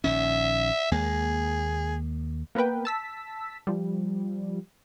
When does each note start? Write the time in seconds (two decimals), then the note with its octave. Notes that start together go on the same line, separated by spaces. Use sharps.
0.04 A#1 D#3 C#4 E5
0.92 D#2 G#3 A#3 G#4
2.55 A#3 B3 A#4 B4 G5
2.85 A5 E6 B6
3.67 F3 G3